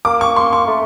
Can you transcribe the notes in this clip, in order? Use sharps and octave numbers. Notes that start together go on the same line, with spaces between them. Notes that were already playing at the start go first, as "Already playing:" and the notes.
A#3 D6
C#6
C6
C#6
A3